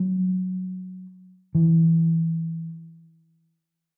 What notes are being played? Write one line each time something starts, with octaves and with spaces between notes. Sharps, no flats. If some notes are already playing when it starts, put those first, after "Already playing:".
Already playing: F#3
E3